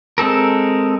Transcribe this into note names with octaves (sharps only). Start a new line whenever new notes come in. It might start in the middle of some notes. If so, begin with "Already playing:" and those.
G#3 C4 A4 A#4